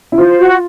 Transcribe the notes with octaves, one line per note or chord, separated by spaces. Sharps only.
E4
F4 C5
F#4